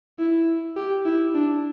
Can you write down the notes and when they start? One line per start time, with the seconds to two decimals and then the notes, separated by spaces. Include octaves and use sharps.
0.19 E4
0.76 G4
1.05 E4
1.34 D4